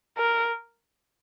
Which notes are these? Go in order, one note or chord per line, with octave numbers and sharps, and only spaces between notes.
A#4